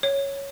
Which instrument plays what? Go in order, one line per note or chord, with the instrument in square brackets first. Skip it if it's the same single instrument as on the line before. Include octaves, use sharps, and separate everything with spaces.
[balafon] C#5